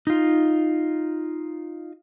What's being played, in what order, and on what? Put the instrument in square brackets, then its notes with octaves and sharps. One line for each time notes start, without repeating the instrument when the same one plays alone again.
[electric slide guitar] D#4 F4